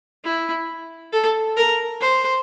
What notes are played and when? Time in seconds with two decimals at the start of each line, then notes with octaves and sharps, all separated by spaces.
0.25 E4
1.12 A4
1.57 A#4
2.01 C5